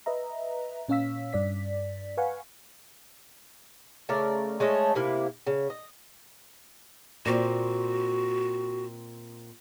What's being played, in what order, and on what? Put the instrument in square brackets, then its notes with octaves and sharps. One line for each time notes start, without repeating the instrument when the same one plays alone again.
[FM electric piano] B4 D#5 E5 A#5
A#2 C#4 C#5 F5 E6 B6
G2 D5 B6
B4 F5 F#5 G#5 C#6
[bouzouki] C#3 A3 A#4 D5
G#3 A3 C#4 D#5
C3 A#3 E4 F5
C#3
D#5
[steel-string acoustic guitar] A#2 C4 [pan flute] F#4